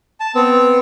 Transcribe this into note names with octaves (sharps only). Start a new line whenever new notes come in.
A5
B3 C4